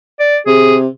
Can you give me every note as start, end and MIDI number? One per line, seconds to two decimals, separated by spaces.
0.20 0.37 74
0.47 0.87 48
0.47 0.76 68